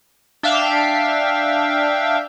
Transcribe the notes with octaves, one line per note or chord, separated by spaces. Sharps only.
D4 E5 F5 G5